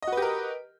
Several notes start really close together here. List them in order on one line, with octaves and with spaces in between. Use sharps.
D#5 F#4 B4 G4 A#4